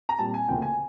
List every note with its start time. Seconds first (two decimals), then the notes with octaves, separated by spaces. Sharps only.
0.09 A#5
0.19 A#2 G3 C4 A5
0.34 G#5
0.48 D2 C#3 F3 A#3 G5
0.62 G#5